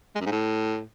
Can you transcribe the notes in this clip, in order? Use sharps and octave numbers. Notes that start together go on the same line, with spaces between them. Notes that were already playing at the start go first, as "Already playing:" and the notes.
G#3
F#2
G#2
A2